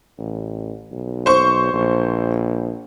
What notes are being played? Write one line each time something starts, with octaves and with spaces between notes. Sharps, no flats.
A1
B1
C5 C#6
A#1